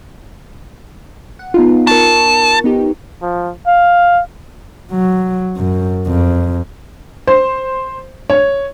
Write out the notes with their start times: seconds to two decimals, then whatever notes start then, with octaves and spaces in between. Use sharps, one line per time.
1.39 F#5
1.54 B3 D#4 F4
1.87 A#4 A5 C#6
2.64 B3 D#4 G4
3.22 F3
3.67 F5
4.92 F#3
5.57 F#2
6.08 F2
7.27 C5
8.30 C#5